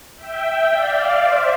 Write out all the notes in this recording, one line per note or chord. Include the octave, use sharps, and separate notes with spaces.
E5 G5
D5 F5
C5 E5